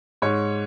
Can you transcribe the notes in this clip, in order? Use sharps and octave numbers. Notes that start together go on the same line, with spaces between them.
G#2 C#5